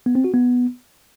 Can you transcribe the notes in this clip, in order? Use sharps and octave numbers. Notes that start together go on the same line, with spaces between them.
B3
C4
F#4
B3